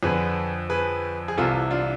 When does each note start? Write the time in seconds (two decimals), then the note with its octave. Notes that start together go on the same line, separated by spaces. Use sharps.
0.03 F2 D3 G#4 B4
0.70 G#4 B4
1.28 G#4
1.38 C2 C3 E3 F4 A4
1.71 D4 F4